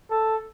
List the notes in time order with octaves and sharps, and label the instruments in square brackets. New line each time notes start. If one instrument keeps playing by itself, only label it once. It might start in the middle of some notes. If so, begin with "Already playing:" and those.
[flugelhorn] A4